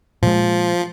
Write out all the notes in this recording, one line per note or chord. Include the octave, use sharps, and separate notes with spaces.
A#2 F3 G#3